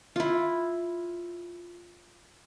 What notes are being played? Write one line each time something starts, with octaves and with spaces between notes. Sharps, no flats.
E4 F4